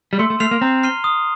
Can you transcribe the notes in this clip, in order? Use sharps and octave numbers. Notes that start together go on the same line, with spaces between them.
G3
A3 C6
A3
A3 F6 C7 F7
A#3
C4 A#5
F6 C7 D#7 G7
D#6